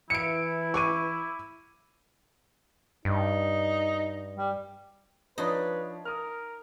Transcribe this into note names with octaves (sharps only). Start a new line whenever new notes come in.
E3 E4 C#7 D7
C#6 D6 D#7
G2 D#4
G3
F3 D4 D#4 B4 C#5
A#4 D#6 F6